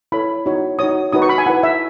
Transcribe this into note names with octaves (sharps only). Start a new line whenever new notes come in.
E4 A4 C#5 B5
D#4 F#4 C#5
D#4 F#4 C#5 D#6
D#4 F#4 B4 D#6
C#6
B5
G#5
E4 B4 F#5
E5